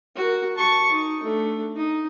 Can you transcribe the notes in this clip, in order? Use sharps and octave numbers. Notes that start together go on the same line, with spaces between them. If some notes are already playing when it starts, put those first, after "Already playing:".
F#4 A#4
A5 C#6
D#4
A3 D4
D#4